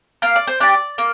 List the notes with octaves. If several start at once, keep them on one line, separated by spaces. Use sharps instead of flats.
A#3 F5
D5
C5
D4 G4 D5
A#3